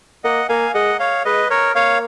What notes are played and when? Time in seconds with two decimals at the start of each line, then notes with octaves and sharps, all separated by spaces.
0.24 A#3 D#5 F#5
0.49 A#3 F5 G#5
0.74 G#3 D#5 F#5
1.00 C#5 F5
1.25 G#3 B4 D#5
1.50 A#4 C#5
1.75 A#3 C#5 F5